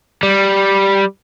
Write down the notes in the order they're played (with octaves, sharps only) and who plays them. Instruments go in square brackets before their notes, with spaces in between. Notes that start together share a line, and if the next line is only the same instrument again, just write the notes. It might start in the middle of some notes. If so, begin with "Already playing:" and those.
[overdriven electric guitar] G3